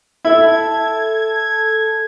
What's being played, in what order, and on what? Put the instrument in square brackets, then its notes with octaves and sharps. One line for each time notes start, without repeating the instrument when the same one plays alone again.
[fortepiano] E4 [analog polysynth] A4 G#6